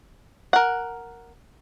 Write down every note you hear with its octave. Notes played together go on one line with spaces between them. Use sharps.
A#4 F#5